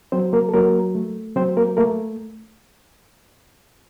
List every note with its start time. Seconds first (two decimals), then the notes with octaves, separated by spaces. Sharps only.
0.12 F#3 C4 C5
0.33 A#3 A#4
0.49 A4
0.53 F#3 A#3 A#4
0.95 A3
1.36 F#3 C4 C5
1.57 A#3 A#4
1.77 A3 A#3 A#4